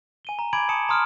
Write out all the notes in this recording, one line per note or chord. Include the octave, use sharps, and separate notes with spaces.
G#5 D#7 G7
A#5
G#5 B5 D6 G#6 D7 F#7
A5 B5 D#6 C#7 E7
A#5 C6 D#6 F6 C#7 D7